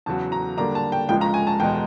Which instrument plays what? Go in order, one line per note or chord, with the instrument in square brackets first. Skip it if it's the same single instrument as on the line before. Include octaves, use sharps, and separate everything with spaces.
[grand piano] E2 C#3 F#3 [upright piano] A5
[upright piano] A#5
[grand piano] D3 G3 A#3 D4 [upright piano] A#5
[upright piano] A5
G5
[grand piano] C#2 C#3 F3 G#3 [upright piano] G5
[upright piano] A#5
G#5
A5
[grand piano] E2 B2 G#3 [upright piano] G5